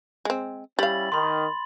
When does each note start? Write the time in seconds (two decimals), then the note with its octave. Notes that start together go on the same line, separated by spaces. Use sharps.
0.25 G#3 C4
0.79 G3 C#4 E4 G4 F5 A6 F#7
1.12 D#3 B5 C6